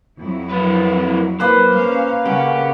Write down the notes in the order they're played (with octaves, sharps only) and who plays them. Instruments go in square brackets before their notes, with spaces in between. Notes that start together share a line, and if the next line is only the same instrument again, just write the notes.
[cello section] F2 F#3 E4
[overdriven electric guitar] A#3 B4
[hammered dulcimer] A#3 B4 [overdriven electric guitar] C5
[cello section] C#4 F5
[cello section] C#3 C#4 [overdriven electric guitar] G4 [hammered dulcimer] F#5